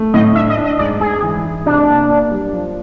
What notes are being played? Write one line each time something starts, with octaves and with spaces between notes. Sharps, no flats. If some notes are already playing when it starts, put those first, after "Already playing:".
Already playing: A3
A2 D#5
D4 E5
D#5
D4
D#5
G#2 D5
G#2 G#4
E3
G#2
C3 D4
A#3
A#3
G3
F3